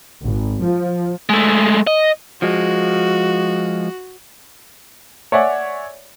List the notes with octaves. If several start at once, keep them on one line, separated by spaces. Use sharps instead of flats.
G#1
F3
G#3 A3
D#5
F3 G#3 F#4
C#5 D5 E5 F#5 G#5